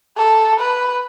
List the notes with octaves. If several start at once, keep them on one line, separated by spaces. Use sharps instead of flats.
A4
B4